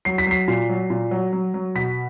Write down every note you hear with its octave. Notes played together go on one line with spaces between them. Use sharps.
F#3 C7
B6
F#3 C7
A#2
F#3
A#2
F#3
F#3
F#3
B2 B6